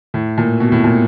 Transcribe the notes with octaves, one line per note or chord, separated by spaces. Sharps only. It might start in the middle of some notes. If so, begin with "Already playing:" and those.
A2
A#2
B2
A2
A#2